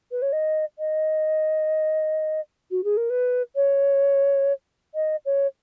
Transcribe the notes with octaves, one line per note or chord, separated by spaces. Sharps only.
B4
C#5
D#5
D#5
F#4
G#4
A#4
B4
C#5
D#5
C#5